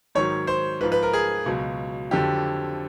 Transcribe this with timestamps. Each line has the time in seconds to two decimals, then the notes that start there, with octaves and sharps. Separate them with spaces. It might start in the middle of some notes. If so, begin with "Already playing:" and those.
0.15 G#2 D#3 F#3 C#5
0.47 C5
0.80 G#2 B4
0.83 F3
0.92 B4
1.03 A#4
1.13 G#4
1.46 C#2 B2 F#3
2.11 F2 D3 F#3 G4